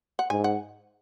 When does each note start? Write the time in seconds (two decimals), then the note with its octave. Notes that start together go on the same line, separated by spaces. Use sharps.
0.19 F#5
0.30 G#2 G#5
0.44 F#5